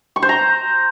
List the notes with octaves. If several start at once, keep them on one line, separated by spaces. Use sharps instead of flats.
C#6
C5
A#5